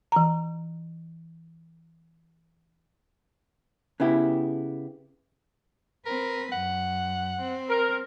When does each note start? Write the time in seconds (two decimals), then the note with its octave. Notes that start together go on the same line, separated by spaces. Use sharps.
0.12 E3 A#5
4.00 C#3 B3 E4 G4
6.06 C4 A#4 B4
6.52 F#2 F#5
7.40 C4
7.69 A#4